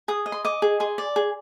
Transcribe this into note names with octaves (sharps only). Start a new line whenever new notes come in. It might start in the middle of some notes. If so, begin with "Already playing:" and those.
G#4 D#6
D#5
C6
D#5 D6
G#4
G#4 C6
D5
G#4